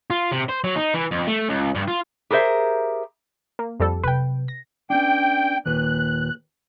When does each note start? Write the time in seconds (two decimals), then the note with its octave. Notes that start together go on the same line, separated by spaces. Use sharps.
0.10 F4
0.32 C3
0.49 C5
0.64 F#3
0.76 D#4
0.94 E3
1.11 F2
1.27 A3
1.49 C#2
1.75 G2
1.88 F4
2.30 G4 G#4 A#4 C5 E5
3.59 A#3
3.80 F2 G3 A4
4.03 C3 F#3 B4 G5
4.48 A#6
4.90 B3 C#4 D4 G5
5.66 D#2 A#2 B4 F#6